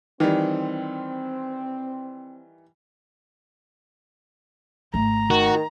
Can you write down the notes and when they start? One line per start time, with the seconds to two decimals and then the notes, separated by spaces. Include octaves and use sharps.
0.20 D#3 E3 G3 C4
4.94 G#1 A3 A#5
5.30 D#3 F#4